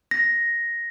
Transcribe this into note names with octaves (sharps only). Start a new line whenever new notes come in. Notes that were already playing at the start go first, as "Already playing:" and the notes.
A#6